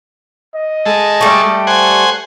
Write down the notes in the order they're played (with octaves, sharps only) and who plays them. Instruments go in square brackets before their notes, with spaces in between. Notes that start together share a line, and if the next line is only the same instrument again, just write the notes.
[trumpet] D#5
[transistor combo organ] G#3 A4
[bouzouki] G3 A3
[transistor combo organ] C5 F#5 G#5